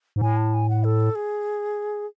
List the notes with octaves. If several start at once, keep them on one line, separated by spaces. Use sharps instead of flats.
G#2
A2 G#5
A5
G#5
F#5
A4
G#4